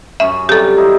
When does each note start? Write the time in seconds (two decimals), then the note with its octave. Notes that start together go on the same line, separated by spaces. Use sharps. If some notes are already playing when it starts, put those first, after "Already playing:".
0.20 F#2 C#4 E5 C#6
0.49 C3 F#3 G3 G4 A4
0.77 D#4 E4 C5